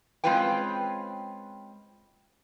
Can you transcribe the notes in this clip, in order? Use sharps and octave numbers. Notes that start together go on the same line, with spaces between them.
G#3 C4 C#4 F4 B4 G5